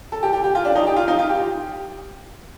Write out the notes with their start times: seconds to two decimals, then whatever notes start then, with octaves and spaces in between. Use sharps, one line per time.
0.12 A4
0.23 G4
0.33 G4
0.44 G4
0.55 F4
0.65 D4
0.75 D#4
0.87 G4
0.96 F4
1.08 D#4
1.19 F4
1.29 G4